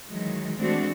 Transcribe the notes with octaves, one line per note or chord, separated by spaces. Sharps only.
D#3 E3 F#3 G#3
E3 G#3 A3 C4 D4 F#4